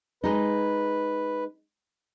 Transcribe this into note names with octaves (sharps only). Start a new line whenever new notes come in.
G#3 D#4 B4